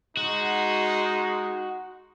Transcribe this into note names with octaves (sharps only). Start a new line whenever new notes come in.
G#3 D#4 F#4